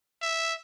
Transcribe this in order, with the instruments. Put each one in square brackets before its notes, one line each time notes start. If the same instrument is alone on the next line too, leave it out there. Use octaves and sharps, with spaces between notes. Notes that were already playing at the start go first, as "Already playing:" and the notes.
[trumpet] E5